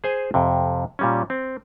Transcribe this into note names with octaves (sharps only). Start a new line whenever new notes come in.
G#4 C5 G#5
F2 C3
A#2 G3 C#4
C4